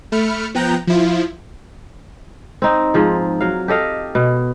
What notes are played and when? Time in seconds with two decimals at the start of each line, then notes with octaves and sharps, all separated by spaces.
0.12 A3 B5 F6 C#7
0.54 F3 B3 G5 A#5 F#6 G6
0.87 F3 E4 F4
2.62 C4 D#4
2.94 G#2 F3 G#4
3.40 F#3 F5
3.68 G4 A4 D#5 F5
4.15 B2